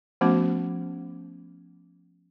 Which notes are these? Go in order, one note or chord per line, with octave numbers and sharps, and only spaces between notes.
F3 A3 B3 C#4 F#4